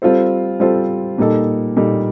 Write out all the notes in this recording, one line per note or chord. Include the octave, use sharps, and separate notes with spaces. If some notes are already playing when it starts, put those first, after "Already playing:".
G3 C4 F4 A4 C5
G3 C4 F4 A4 C5
A#2 G3 A#3 D#4 A4
A#2 G3 A#3 D#4 A4